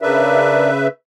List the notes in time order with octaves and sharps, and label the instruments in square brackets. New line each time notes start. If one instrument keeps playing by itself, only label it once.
[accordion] C#3 B4 E5 [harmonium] D4 A#4 D5